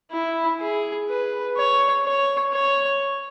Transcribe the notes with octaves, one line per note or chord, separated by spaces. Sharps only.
E4
G#4
B4
C#5
C#5
C#5